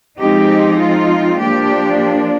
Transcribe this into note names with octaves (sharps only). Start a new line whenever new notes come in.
F3 G#3 C4 D#4 G4
F4
F3 A#3 D4 G4